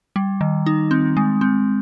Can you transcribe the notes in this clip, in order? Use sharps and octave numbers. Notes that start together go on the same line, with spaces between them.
G3
D#3
D#4
C4
G#3
C4